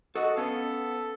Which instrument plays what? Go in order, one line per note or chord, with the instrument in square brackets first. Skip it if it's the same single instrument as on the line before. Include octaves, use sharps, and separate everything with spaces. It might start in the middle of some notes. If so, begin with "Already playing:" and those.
[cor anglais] F#4 [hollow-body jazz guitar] A4 D#5 F#5
[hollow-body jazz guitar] B3 C#4 F5 [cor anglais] A4